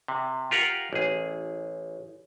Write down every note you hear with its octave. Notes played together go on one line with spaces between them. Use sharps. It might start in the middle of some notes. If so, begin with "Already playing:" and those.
C3
F4 G4 A#4 F5 F#5
A1 G#4